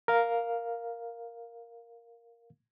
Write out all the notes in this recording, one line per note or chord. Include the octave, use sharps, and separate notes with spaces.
A#4 F5